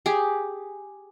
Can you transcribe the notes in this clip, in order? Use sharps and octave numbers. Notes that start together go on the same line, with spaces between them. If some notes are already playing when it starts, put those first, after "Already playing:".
G4 G#4